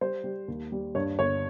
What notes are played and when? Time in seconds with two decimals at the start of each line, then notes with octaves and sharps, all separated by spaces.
0.01 G3 C5
0.24 G3
0.48 D#2
0.72 G3
0.95 G2 C#5
1.19 G1 C#5